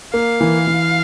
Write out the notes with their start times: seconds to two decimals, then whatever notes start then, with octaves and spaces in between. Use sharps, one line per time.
0.14 A#3 F5
0.41 E3
0.67 E3